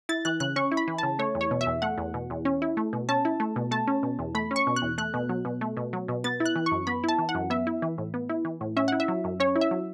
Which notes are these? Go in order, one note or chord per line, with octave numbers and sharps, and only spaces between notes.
E4 A6
E3 F#6
C#3 F#6
C#4 C#6
E4
B5
E3
C#3 A5
A3 C#5
E2
C#5
B2
E5
E2
A3 F#5
E2
B2
E2
C#4
E4
A3
B2
C#4 A5
E4
A3
B2
A3 A5
C#4
B2
E2
A3 B5
C#4
C#6
B2
F#6
E2
A3 F#6
B2
F#3
B2
A3
B2
F#3
B2
B3 A6
E4
F#6
E3
C#6
F#2
B3 B5
E4 A5
E3
F#5
F#2
B3 E5
E4
E3
A2
B3
E4
E3
A2
C#4 E5
E4 F#5
E5
F#3
F#2
C#4 C#5
E4
E5
F#3